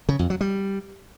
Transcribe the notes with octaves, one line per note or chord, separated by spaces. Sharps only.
C#3
F2
F#3
G3